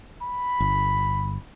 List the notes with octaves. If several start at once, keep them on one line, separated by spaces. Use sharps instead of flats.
B5
G1